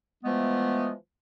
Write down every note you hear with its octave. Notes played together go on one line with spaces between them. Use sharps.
E3 F3 G#3 A3 B3